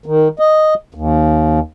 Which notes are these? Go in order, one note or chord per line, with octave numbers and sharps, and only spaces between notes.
D#3
D#5
D#2